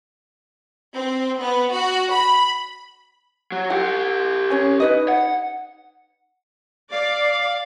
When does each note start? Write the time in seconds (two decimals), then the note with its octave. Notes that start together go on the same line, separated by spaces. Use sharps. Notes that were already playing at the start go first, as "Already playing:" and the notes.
0.95 C4
1.40 B3
1.72 F#4
2.12 B5
3.52 F#3
3.70 E4 G4 F#5
4.50 C#4 C#5 G#5
4.80 D#4 B4 D#5
5.08 F#5
6.92 D5 F5